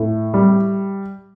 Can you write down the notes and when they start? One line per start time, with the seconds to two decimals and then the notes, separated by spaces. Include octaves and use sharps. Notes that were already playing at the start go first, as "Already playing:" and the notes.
Already playing: A2
0.34 G3